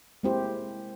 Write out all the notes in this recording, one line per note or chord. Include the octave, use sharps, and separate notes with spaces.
G#3 A#3 C4 E4 G4 C5